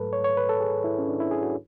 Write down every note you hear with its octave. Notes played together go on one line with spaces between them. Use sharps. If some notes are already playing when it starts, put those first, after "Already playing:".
Already playing: G#2 F#3 A3 A4 B4
C#5
C#5
B4
A4
G#4
E4
C#4
D4
E4
G#4
F#4